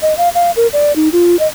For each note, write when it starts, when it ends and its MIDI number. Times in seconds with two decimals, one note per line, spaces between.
0.02 0.16 75
0.18 0.29 77
0.35 0.51 77
0.56 0.67 70
0.73 0.94 74
0.96 1.09 63
1.13 1.38 65
1.39 1.47 75